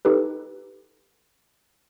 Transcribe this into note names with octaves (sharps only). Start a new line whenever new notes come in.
D#4 G4 A4 B4